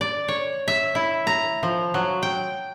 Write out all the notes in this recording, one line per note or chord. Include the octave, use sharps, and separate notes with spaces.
D5
C#5
E5
E4
A#5
F3
F#3
G5